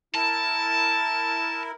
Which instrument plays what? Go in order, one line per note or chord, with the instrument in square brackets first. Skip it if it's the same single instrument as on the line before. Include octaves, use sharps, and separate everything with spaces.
[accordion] E4 A#4 [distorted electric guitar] A5